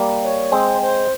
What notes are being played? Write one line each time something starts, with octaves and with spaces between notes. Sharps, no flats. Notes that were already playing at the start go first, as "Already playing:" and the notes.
Already playing: G3 A#3
C#5
G#3 C4 C5
C5